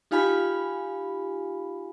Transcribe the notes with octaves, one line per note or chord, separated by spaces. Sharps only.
D#4 F4 G4 F5 G#5 B5